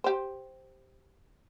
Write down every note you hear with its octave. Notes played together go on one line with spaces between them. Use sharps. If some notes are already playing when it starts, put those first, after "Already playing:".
G4 C5